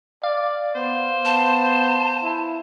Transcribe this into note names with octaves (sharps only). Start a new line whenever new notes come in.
D5 F5
B3 C5
B3 A5
E4